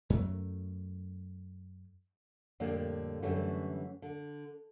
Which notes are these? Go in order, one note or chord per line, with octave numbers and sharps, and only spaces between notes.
F#2 F#3 G3 A3
F2 A2 D3 G3 A#3 D4
F#2 D3 E3 G3 A3 C#4
D3